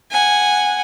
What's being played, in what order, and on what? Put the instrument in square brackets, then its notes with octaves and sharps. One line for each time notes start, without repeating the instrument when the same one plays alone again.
[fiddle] F#5 G#5